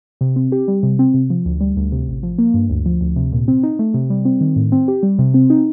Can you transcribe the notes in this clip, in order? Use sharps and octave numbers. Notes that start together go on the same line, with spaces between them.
C3
C4
G4
G3
C3
C4
C3
F3
D2
G3
D2
C3
A1
F3
A#3
G2
D2
F3
D2
C3
A#2
C4
D#4
A3
C3
G3
C4
D#3
A2
C4
G4
G3
C3
C4
D#4